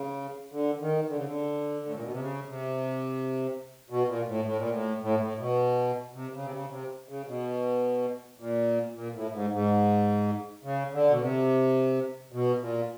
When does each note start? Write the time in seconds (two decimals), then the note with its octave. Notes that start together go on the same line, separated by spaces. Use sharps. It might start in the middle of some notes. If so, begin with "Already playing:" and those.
Already playing: C#3
0.52 D3
0.81 D#3
1.08 D3
1.17 C#3
1.25 D3
1.86 A2
1.95 A#2
2.04 B2
2.12 C3
2.20 C#3
2.48 C3
3.90 B2
4.08 A#2
4.28 A2
4.45 A2
4.58 A#2
4.71 A2
5.03 A2
5.20 A2
5.39 B2
6.15 C3
6.34 C#3
6.43 C3
6.53 C#3
6.70 C3
7.09 C#3
7.27 B2
8.39 A#2
8.95 A#2
9.14 A2
9.33 G#2
9.52 G#2
10.64 C#3
10.93 D3
11.10 B2
11.21 C3
12.32 B2
12.62 A#2